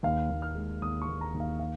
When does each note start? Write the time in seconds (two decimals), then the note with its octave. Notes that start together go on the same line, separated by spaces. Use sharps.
0.03 D#2 F5
0.30 D#2
0.42 F6
0.55 G#3
0.82 D#2 D#6
1.02 C#6
1.09 D#2
1.21 A#5
1.34 D#2
1.40 F5
1.60 F5